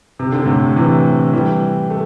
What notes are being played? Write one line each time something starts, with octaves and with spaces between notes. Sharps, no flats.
C3
D3
A2 C3
C3 E3
E3 G3
A3